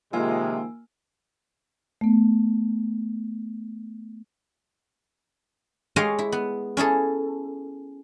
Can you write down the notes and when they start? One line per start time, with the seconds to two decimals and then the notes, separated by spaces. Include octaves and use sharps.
0.13 C3 D#3 F3 G#3 A#3 F4 G#5 E6
2.01 A3 B3
5.96 G#3 G4 G#4 C#5 D#5 F5
6.19 E4
6.32 B3
6.77 C#4 E4 G#4 A4